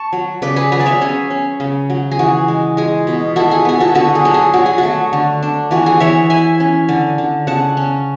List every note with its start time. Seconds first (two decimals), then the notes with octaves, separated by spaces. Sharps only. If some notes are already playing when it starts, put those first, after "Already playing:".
Already playing: A5 C#6
0.13 F#3
0.42 C#3 B4 D5
0.56 G#4 B4
0.71 F#3 G#4 B4
0.80 D5
0.86 C#5 E5
1.01 C#4 G#4
1.30 C#4
1.60 C#3
1.90 F#3
2.11 G#4
2.19 E3 F#4
2.48 G#3
2.77 G#3 G#4
3.07 B2
3.36 E4 F#4 A4
3.51 G#4
3.65 B3 G#4
3.80 F#4 A4
3.95 D3 F#4 A4
4.15 G#4
4.25 F#3 A4
4.34 G#4
4.54 F#3 F#4
4.66 G#4
4.78 F#4
4.83 A3
5.13 D3
5.43 D4
5.71 E3 F#4
5.86 G#4
6.00 E3 C#5 E5
6.30 E4 E5 G#5
6.60 C#4
6.89 D3
7.18 D3
7.47 C#3 F#5 A5
7.77 C#4